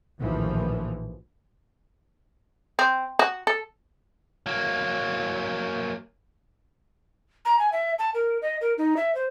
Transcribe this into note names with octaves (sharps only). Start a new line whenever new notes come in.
A#1 D#2 A2 E3 F3
C4
F#4
A4
F#3 A#3
A#5
G#5
E5
A5
A#4
D#5
A#4
D#4
E5
C5